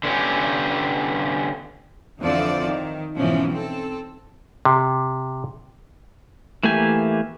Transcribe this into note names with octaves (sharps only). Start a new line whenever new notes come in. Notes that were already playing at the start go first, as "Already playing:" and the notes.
D3 B3 C#4 G4
F2 D3 E3 F3 C4 D5
D#3
F2 G#2 B2 E3 F3 C#4
C4 A4
C3
E3 A3 A#3 G4 G#5